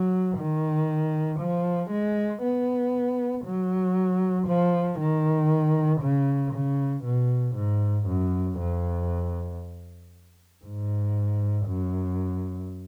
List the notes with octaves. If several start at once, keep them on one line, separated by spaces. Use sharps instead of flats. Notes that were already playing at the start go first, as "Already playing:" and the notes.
Already playing: F#3
D#3
F3
G#3
B3
F#3
F3
D#3
C#3
C#3
B2
G#2
F#2
F2
G#2
F#2